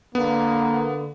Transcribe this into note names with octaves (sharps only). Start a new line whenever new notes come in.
D3 A#3 B3